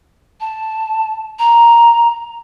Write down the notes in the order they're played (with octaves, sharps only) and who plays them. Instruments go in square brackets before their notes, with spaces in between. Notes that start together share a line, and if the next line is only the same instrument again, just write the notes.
[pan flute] A5
A#5